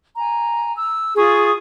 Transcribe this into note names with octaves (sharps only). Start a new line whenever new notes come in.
G#5 A#5
E6
F4 G#4 C#6 D#6